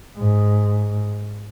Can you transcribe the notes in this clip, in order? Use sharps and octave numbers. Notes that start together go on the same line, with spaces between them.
G#2